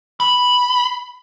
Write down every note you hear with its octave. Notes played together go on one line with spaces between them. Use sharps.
B5